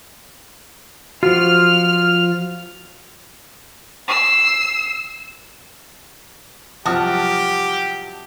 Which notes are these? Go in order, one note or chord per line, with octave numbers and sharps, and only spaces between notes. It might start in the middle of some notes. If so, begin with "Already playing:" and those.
F3 F4 F#4 F6
E6 C7
C2 F3 F#3 F#4 G4 A5 D#6 F6